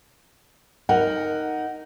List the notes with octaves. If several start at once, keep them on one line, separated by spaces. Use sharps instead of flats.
D#4 A#4 F#5